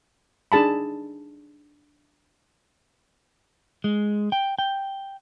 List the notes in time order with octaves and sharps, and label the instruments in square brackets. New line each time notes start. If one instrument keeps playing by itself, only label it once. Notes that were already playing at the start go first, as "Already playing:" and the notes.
[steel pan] D4 D#4 G#4 A5 B5
[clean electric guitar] G#3
G5
G5